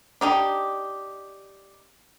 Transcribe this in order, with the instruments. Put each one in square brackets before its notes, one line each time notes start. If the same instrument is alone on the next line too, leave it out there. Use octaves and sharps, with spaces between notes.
[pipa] D4 D#4 G4